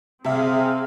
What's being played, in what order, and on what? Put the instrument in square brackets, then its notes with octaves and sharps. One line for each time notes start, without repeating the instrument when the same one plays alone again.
[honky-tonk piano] C3 E5 [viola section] C4 G#4 F5